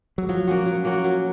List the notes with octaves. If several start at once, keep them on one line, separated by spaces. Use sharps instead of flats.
F#3
F3 F#3
A#3 C#4 F#4
F#3
A#3 C#4 F#4
F#3